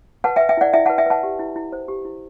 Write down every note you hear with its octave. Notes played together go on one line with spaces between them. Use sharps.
B4 F#5 A5
E5 G5
B4
E5 G5
E4 D5 F#5
E4 E5 G5
F#5 A5
B4
E5 G5
B4 F#5 A5
G4
E4
E4
C5
G4
E4